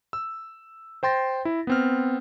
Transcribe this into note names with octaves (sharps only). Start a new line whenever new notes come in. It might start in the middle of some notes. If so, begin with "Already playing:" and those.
E6
C5 G5 C6 A6 A#6
E4
B3 C4 F6